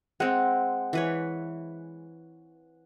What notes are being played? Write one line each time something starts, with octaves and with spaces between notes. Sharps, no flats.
G#3 C4 F#5
E3 B4 C#5